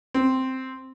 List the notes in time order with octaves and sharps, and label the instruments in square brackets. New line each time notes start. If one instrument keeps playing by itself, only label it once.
[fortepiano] C4